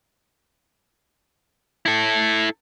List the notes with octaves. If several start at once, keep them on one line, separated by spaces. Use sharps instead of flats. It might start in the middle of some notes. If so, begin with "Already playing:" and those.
E4 A4